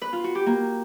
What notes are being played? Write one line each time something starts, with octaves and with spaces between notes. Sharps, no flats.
B4
F4
F#4
G4
A#3